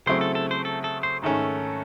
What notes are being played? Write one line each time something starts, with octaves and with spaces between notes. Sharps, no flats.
C#3 F#3 A3 C4 E4 C5
A4
A4
C5
A4
A4
C5
G#2 D#3 A3 C#4 A4